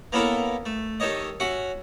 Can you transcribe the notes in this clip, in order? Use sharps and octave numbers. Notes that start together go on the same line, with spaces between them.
A#3 B3 C#4 E4 A4 A#4
A3
D#3 G4 A4 C#5 D#5
C#4 F#4 E5 F#5